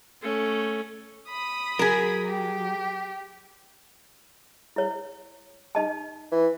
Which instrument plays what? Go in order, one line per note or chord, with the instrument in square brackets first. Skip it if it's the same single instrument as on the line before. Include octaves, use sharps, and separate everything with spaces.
[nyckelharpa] A3 C#4
[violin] B5 D#6
[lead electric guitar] F#3 [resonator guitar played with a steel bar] G#4 A#4
[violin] G4
[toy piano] E4 C#5
D#4 D#5 A5
[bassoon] E3